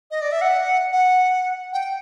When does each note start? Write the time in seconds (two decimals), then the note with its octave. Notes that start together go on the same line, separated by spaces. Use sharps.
0.11 D#5
0.21 D5
0.32 E5
0.41 F#5
0.92 F#5
1.73 G5